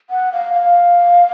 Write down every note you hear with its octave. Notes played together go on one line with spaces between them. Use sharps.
F#5
F5
F5